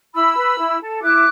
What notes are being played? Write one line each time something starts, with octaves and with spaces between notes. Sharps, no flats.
E4 B5 E6
B4
E4
A4
E4 D6 F#6